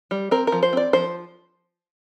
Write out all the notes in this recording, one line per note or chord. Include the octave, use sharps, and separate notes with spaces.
G3
C4 A#4
A#4
F3
C5
C4 D5
F3 C5